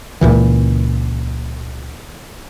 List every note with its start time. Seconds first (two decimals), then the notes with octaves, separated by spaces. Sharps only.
0.21 C#2 A#2 E3